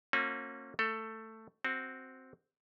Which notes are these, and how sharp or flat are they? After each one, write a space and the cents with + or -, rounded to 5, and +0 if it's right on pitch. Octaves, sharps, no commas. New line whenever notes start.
A#3 -35 C#4 -35 F#4 -35
A3 +10 A4 +15
C4 +0 F#4 +0